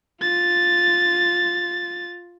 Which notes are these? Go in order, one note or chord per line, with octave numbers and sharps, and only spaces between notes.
F4 A6